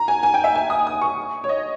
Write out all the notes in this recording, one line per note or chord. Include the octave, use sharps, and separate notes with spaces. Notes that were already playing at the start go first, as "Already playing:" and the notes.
Already playing: A#5
G#5
G#5
G5
E5
G#5
D#6
D#6
C#6
C#5
D#5